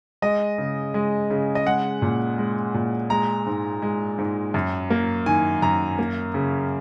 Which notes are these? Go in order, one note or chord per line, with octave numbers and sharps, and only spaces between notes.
G#3 D#5
C#3
G#3
C#3
D#5
G#3 F#5
A#2
G#3
A#2
G#3 A#5
G#2
G#3
G#2
F#2
A#3
D#3 G#5
F#2 A#5
A#3
C#3